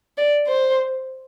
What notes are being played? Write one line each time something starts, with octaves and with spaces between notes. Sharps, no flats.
D5
C5